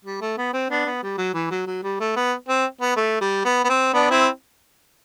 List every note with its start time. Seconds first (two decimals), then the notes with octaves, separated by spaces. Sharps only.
0.04 G3
0.21 A3
0.37 B3
0.53 C4
0.70 B3 D4
0.85 B3
1.03 G3
1.18 F#3
1.34 E3
1.50 F#3
1.67 F#3
1.83 G3
2.00 A3
2.16 B3
2.48 C4
2.81 B3
2.96 A3
3.21 G3
3.45 B3
3.64 B3
3.69 C4
3.93 B3 D4
4.10 C4 E4